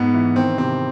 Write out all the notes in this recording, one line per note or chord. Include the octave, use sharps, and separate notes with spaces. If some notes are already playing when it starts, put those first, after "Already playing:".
Already playing: G#2 B3
E3
D#3 C4
C3 C4